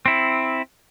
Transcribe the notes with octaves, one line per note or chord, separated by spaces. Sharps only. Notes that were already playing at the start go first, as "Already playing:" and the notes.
C4 E4